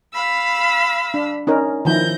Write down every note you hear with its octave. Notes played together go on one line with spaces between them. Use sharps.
F5 B5 E6
D4
C#4 D#4 A#4
D#3 F3 E4 G6 A#6